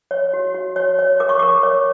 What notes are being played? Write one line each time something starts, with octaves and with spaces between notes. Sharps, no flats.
C#5
F#4
F#4
C#5
C#5
A#4 D6
C#6
A#4 D6
C#5